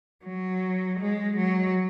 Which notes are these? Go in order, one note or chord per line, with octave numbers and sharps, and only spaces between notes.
F#3
G#3
F#3